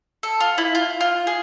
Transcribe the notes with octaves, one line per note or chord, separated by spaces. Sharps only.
A4
F4
E4
F4
F4
G#4